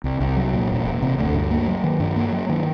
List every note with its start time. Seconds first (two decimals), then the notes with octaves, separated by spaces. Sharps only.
0.04 C2
0.20 C2
0.37 F#3
0.53 A#2
0.70 E1
0.85 E1
1.02 C3
1.18 D2
1.34 G2
1.51 A#3
1.68 F#3
1.84 D#3
2.00 G2
2.16 A#3
2.32 F#3
2.49 D#3